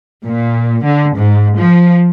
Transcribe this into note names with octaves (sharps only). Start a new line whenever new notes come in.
A#2
D3
G#2
F3